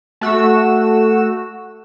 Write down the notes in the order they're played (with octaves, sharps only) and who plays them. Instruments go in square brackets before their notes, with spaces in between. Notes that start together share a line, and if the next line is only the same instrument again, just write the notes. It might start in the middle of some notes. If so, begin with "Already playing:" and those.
[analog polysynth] A3 F#4 E6